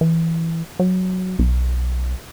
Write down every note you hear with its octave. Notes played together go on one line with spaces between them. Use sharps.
E3
F#3
B1